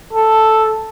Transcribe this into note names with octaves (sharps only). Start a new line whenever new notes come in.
A4